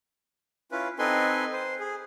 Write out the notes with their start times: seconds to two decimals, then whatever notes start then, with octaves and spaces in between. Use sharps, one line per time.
0.71 C#4 E4 F4 B4
0.99 C4 D#4 A4 B4 G#5 C6
1.53 C5
1.80 G#4